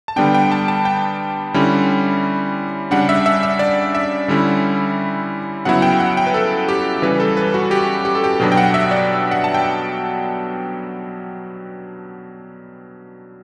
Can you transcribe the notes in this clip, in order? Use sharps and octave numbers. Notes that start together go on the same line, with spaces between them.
A5
D3 G3 B3 D4 G5
G5
A5
A5
G5
D3 G3 C#4 E4
C#3 G3 D4 F#5
E5
E5
E5
D5
E5
D3 G3 C#4 E4
C#3 F#3 B3 E4 F#5
G5
F#5
G5
B4
A4
G4
C#3 E3 G3 B4
A4
B4
F#4
G4
G4
A4
G4
B2 F#3 B3 D4
G5
F#5
E5
D5
F#5
A5
G5